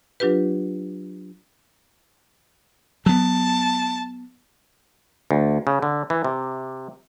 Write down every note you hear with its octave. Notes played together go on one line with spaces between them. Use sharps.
F#3 D4 F4 G4 B4
F#3 B3 A5
D2
C#3
D3
E3
C3